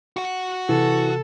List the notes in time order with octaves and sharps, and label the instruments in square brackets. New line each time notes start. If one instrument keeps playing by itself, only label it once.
[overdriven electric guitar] F#4 F#5
[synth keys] C3 [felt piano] E3 [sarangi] A4